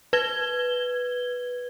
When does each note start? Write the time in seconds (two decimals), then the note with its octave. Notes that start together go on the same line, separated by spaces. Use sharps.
0.13 B4 G#6 G7